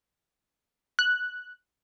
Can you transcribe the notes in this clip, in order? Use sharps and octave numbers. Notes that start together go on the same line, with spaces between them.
F#6